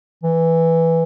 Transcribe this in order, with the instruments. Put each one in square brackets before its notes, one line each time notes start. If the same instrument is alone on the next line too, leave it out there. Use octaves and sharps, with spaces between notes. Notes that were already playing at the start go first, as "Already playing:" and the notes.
[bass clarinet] E3